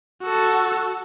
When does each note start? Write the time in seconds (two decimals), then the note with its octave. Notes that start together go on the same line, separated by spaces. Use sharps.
0.22 F#4 A4